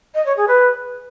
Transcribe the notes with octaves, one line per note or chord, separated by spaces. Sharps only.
D#5
C#5
G#4
B4